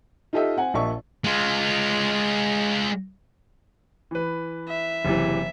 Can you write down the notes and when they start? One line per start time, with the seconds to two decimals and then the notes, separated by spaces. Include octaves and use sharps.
0.33 D#4 F4 G4 A4 D#5 E5
0.57 C4 F#5 G#5
0.74 A#1 A#2 D#5 E5 A5 C#6
1.24 G#3 F4
4.11 E3 B4
4.69 E5
5.05 F#1 C3 E3